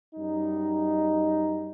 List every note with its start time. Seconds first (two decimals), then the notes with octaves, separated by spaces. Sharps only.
0.15 F#2 G3 D#4